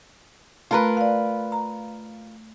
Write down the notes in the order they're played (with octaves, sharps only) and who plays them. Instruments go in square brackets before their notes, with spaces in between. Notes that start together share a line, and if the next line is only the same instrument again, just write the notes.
[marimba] A3 [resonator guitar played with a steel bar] F4 A#4 B4
[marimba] D5 F5
A#5